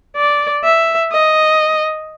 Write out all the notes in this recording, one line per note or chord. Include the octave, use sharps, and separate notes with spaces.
D5
E5
D#5